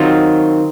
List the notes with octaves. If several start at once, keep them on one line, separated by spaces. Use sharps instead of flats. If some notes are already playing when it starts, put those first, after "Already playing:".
Already playing: D#3 F#3 C4 F4